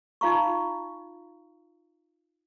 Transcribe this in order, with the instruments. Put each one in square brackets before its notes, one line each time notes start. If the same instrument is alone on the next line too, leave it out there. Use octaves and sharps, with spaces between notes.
[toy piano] D#4 F4 F5 A#5 C#6